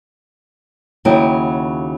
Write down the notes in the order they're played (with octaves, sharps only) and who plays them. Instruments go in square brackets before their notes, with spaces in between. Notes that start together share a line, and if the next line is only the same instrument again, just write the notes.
[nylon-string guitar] D#2 C#3 F#3 D#4 E4 G5